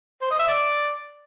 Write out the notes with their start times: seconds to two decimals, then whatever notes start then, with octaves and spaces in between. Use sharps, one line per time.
0.22 C5
0.30 D#5
0.39 E5
0.48 D5